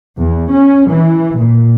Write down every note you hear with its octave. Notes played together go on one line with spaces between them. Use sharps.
E2
C#4
E3
A#2